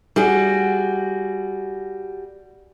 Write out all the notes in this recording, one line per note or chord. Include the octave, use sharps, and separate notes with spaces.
G3 F#4 G#4